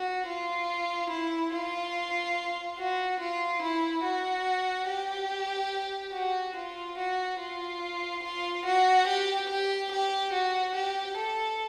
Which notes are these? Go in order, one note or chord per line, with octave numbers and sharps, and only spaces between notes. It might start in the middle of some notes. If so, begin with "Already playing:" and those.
Already playing: F#4
F4
E4
F4
F#4
F4
E4
F#4
G4
F#4
F4
F#4
F4
F4
F#4
G4
G4
G4
F#4
G4
A4